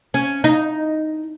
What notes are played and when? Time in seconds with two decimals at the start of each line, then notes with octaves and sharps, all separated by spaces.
0.14 C#4
0.44 D#4